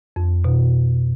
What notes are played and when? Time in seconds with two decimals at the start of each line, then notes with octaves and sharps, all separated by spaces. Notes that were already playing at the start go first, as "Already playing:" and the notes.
0.16 F2
0.44 B2